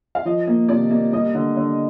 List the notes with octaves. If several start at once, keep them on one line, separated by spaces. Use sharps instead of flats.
F5
F3 D#5
A#3
C3 D5
A#3
G3 D#5
D3
D3